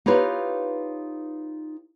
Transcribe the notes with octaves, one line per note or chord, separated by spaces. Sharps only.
D#4 F4 G4 B4 C#5 F5